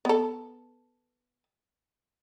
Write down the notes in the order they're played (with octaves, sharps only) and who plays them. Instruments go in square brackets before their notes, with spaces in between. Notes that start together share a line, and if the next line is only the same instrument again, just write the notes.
[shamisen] B3 A4